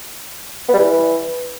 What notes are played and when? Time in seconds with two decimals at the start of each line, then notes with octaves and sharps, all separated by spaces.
0.69 B3
0.74 G3
0.79 E3